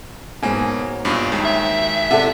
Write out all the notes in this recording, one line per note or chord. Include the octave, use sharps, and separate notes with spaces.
G#2 B2 F#3 A#3 G#5
B1 G2 A#2
D#2 D#3 G#3
E5
C3 A4 D5 F#5